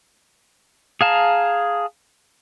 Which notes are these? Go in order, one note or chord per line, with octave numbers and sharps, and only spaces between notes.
G#4 F5 A5 A#5